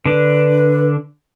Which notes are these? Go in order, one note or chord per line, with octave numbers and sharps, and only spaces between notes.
D3 D4 B4